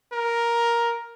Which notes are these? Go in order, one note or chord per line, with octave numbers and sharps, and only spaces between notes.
A#4